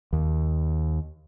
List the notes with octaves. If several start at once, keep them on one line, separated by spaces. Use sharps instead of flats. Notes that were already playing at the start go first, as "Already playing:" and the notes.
D#2